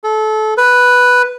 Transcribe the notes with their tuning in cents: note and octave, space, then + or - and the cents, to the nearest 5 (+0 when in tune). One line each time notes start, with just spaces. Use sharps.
A4 -25
B4 +0